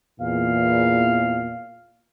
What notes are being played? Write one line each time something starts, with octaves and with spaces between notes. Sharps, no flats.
E2 A#2 F5